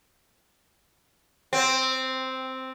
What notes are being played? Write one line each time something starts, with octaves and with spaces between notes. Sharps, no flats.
C4